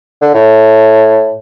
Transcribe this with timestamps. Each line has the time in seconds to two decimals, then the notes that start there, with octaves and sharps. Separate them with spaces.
0.21 D3
0.34 A2